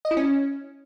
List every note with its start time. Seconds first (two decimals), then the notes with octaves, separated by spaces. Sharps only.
0.05 D#5
0.11 E4
0.17 C#4